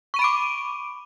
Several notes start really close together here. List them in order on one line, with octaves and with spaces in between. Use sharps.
C#6 D#7 B5 D7 D6